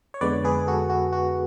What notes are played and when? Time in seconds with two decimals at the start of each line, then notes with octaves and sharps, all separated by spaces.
0.14 C#5
0.21 F2 D3 G#3 B3 B4 D5
0.44 G#4 B4
0.67 F#4 A4
0.90 F#4
1.13 F#4